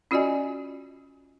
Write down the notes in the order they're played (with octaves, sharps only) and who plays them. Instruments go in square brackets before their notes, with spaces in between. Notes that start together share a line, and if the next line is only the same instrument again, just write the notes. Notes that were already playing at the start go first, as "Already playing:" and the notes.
[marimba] C#4 F4 F#4 D5 D#5 G#5